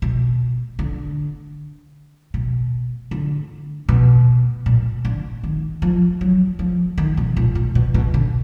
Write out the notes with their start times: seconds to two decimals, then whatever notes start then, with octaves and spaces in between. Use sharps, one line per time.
0.02 B2
0.79 D3
2.34 B2
3.11 D3
3.89 B2
4.66 A#2
5.05 D3
5.43 D#3
5.82 F3
6.21 F#3
6.59 F3
6.98 D#3
7.17 B2
7.37 A#2
7.55 A#2
7.75 B2
7.94 B2
8.14 D3